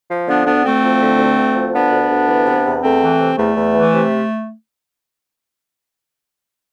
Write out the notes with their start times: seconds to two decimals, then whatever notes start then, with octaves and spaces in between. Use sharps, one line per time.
0.09 F3
0.27 D3 B3 D4
0.45 D2 B3 D4
0.64 D2 A3 C4
0.81 F3
1.00 D3
1.18 D2
1.36 D2
1.55 F3
1.73 D3 B3 D4
1.91 D2
2.10 D2
2.27 E3
2.46 C3
2.64 E2
2.83 E2 A3 C4
3.01 E3
3.19 C3
3.37 E2 A3
3.55 E2
3.74 E3
3.93 C3